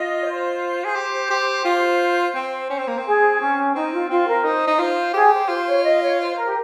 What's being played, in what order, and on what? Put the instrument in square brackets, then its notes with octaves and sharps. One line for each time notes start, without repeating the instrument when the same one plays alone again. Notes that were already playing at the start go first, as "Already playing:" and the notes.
Already playing: [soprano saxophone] F4 [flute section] D#5
[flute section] C#5
C5
[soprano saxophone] G#4
G4
G4
F4
C4
C#4
C4
A#3
C4
[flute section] G#4
C#4
[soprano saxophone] C4 [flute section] D#4
[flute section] F4
[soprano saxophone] C4 [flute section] F4
[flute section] A#4
[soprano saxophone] D#4 [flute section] C5
[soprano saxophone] D#4
[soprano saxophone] F4 [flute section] C5
[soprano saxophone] G4 [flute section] G#4
[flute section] C5
[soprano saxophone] F4 [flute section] C5
[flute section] C#5
D#5
C#5
C5
A#4
G4